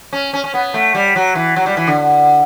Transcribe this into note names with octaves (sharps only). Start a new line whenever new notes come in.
C#4
C#4
C#4
B3
A3
G3
F#3
E3
F#3
G3
E3
D3